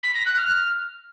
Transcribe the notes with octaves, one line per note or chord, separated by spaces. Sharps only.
B6
A#6
F#6
F6